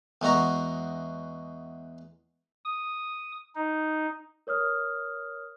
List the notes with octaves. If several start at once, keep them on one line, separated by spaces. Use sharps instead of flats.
E2 G#3 F#4 A#5
D#6
D#4
A#4 C#5 D#6 F6